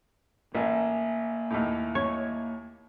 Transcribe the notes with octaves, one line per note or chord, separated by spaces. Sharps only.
A1 A#3 A#4 E5 G#5
D#2 A2
C#5